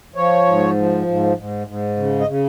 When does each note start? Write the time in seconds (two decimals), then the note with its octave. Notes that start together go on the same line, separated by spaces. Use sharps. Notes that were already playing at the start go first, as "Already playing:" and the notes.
0.15 F3 C#5
0.47 G#2
0.77 F3
1.07 G#2
1.37 G#2
1.67 G#2
1.97 C#3
2.20 D#5
2.27 C#3